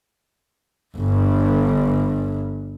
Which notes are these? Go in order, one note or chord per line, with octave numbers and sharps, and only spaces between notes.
G1 G2